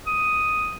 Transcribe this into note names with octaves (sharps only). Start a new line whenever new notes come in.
D#6